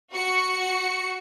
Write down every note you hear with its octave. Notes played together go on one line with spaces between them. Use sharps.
F#4 C#7